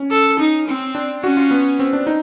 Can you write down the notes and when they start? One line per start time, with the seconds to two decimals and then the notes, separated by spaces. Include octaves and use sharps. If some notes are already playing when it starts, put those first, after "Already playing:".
Already playing: C#4
0.11 A4
0.39 D#4
0.68 C4
0.95 D4
1.23 C#4 F#4
1.37 F4
1.51 B3
1.79 C4
1.93 D4
2.07 D#4